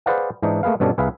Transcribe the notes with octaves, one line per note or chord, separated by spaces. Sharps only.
G#4 B4 C5 D5 F5 F#5
G#2 E3 D4 D#4
A3 A#3 G#4 B4 F5
G2 B2 C#4 A4 C#5 D5
C2 G#4 B4 E5 F5